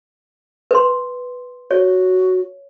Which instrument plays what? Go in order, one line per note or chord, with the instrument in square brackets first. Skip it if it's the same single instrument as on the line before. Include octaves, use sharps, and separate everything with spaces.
[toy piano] B4 C6
[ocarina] F#4 [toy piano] C#5